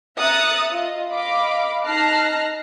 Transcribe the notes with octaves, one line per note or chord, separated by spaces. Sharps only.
E5 A#5 D#6 F#6 A6 C#7
F4 D#5
D#5 F5 B5 D6
D#4 A5 F6 F#6 A#6 C7